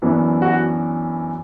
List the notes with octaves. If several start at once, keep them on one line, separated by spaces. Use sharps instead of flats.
F#2 E3 B3 D4
F#4